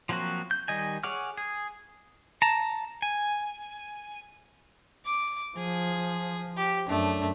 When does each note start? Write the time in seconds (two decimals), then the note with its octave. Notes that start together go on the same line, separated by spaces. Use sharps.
0.09 F3 F#3 A#3 C4 F#4
0.51 G6
0.68 D#3 G3 D#5 G#5
1.03 G#4 C#5 F#5 D6 F6
1.37 G#4
2.42 A5 A#5
3.02 G#5
5.05 D6
5.57 F3 G#4
6.57 G4
6.88 F#2 A3 D4